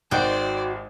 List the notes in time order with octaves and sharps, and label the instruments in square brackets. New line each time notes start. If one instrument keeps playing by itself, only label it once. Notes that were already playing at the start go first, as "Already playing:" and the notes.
[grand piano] G#1 G#2 [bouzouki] F#4 G5 [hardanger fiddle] C5 D5